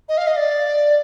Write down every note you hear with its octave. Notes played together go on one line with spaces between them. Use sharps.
D#5
F5
D#5
D5